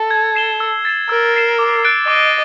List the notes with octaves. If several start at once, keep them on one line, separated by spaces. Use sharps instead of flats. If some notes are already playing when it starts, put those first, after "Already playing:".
Already playing: A4
G#6
C7 E7 G7
E6
A6 C7 E7
A#4 E6
A6 C7 E7
D6
F#6 A6 D7 G7
D#5 D6